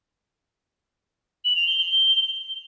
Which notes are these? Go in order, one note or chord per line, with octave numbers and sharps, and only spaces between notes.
F#7
F7
G7
G7